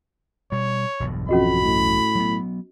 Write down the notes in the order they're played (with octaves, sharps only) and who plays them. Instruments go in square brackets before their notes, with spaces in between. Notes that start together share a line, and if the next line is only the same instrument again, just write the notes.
[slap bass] B2 G3 [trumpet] C#5
[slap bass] E1 B1 G2
[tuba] F2 [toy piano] C#4 F#4 D#5 [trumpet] B5
[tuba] A2
[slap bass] F#3 B3